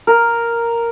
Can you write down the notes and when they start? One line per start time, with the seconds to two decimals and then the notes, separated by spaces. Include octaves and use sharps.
0.07 A#4